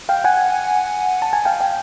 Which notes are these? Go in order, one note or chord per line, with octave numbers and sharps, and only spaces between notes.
F5 G5
F#5 G#5
A5
G#5
F5 G5
F5 G5